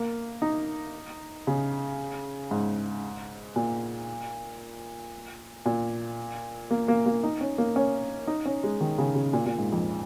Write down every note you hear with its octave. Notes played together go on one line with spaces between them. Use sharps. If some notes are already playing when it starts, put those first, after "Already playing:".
Already playing: A#3
D#4
C#3
G#2
A#2
A#2
A#3
A#3
A#3
D#4
C#4
A#3
C#4
D#4
C#4
G#3
D#3
C#3
C#3
A#2
A#2
G#2
F2